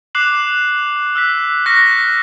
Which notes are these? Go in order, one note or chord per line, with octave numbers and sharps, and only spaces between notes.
D6 F#6 C7 E7 F#7
E6 F#6 B6
C#6 F6 F#6 A#6 B6 C#7